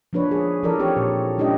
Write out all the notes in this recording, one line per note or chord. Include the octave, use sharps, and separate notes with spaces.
F3 A#3 D4 B4 C#5
G#4
E3 F3 A4 A#4 D5
C4 G4 C#5
A#2
G#3 C#4 D4 E4 G4 D#5